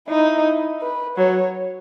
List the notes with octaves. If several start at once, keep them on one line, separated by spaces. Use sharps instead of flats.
D#4 E4
B4
F#3 C#5